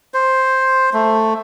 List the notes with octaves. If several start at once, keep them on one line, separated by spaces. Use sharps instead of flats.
C5
A3